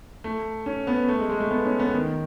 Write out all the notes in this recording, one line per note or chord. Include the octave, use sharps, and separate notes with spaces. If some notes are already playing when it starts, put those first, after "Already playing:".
A3
C#4
B3
A3
G#3
G#3
A3
B3
C#4
B3
D#3